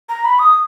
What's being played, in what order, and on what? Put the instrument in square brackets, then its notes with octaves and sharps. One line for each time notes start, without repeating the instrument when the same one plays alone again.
[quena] A#5
B5
D#6